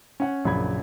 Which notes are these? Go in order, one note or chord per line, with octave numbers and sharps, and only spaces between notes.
C#4 F#5
A#1 F#2 C#3 B5 G#6